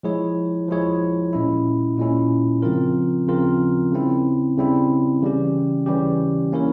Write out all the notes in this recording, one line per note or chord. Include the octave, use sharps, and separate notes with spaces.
F3 G#3 E4 G#4 C#5
F3 G#3 E4 G#4 C#5
A#2 G#3 C#4 E4
A#2 G#3 C#4 E4
C#3 F3 C4 F4 A#4
C#3 F3 C4 F4 A#4
C#3 G3 C4 E4
C#3 G3 C4 E4
C#3 E3 G3 C#4 G4
C#3 E3 G3 C#4 G4
A#3 C#4 E4 A#4 C#5